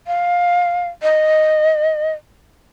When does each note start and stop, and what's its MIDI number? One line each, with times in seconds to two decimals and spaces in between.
0.07 0.87 77
1.02 2.12 75